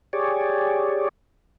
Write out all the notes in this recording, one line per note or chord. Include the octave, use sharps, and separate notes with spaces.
G4 G#4 C#5 D5